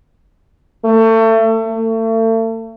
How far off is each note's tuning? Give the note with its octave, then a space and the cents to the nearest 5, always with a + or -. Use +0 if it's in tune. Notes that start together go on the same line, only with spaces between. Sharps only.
A3 +30
A3 +35